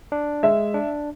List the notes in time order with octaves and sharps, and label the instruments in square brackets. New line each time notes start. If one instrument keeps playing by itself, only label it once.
[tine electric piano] D4
[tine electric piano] G#3 [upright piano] E5
[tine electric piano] D4